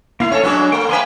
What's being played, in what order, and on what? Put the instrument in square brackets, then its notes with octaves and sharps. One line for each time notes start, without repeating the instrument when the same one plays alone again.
[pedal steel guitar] A#3 F5 [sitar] E4
[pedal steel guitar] C#4 [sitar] A4 C#5
[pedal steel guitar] F#3 G#3 D4 [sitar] B3 C#4 F#4
[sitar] A3 [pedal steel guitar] G5
[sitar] A#3 B4 [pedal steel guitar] E5 G#5 C6